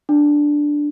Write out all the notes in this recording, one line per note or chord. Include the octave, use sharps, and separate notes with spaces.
D4